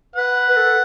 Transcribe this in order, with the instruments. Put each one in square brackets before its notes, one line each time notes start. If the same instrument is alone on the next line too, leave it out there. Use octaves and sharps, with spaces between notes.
[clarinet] B4 [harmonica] F#5
[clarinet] B4
A4